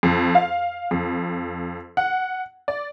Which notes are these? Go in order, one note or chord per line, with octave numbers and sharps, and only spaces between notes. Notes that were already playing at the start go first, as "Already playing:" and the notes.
F2
F5
F2
F#5
D5